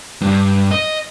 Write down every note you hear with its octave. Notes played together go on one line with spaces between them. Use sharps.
G2
D#5